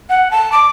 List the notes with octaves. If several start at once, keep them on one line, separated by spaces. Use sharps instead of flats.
F#5
A5
D6